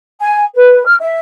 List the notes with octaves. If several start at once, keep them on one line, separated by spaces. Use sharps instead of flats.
G#5
B4
F6
E5